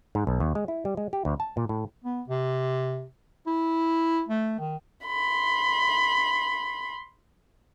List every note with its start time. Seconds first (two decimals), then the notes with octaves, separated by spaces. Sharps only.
0.15 G#2
0.27 B1
0.40 D#2
0.55 G#3
0.68 E4
0.85 G3
0.97 G#3
1.13 G4
1.25 D2
1.40 A5
1.57 A#2
1.69 A2
2.04 B3
2.28 C3
3.47 E4
4.28 A3
4.59 D#3
5.06 B5 C6